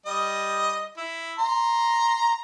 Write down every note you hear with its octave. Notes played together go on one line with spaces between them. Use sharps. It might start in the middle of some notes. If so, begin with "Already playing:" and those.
G3 D#5
E4
A#5 C6